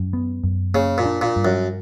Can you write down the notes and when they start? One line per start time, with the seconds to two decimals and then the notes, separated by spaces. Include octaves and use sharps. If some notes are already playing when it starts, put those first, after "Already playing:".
Already playing: F#2
0.13 B3
0.44 F#2
0.74 C#3 A#3
0.98 A#2
1.05 D4
1.21 A#2
1.36 G2
1.45 F#2